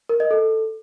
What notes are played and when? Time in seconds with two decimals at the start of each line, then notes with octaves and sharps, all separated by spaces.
0.09 A#4
0.20 D#5
0.31 A4